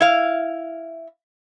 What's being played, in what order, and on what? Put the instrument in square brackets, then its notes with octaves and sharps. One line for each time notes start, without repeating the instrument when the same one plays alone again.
[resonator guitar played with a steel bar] E4 F5